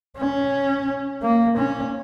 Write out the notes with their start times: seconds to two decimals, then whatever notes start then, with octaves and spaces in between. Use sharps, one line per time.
0.17 C#4
1.22 A#3
1.57 C#4